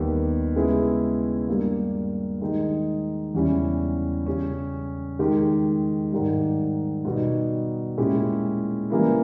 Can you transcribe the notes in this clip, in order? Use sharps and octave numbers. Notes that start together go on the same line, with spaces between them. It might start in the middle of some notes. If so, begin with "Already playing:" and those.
Already playing: D#2 D#3 G3 B3 G4
C#3 G#3 B3 E4 G#4
G2 G3 A#3
D#3 G#3 D#4
E2 C#3 G3 C#4 E4
C#3 G3 C#4
D#3 G#3 D#4 G4
G#2 D#3 G3
B2 G3 B3 D#4
A#2 G#3 C#4 E4 G4
C#3 E3 G3 A#3 E4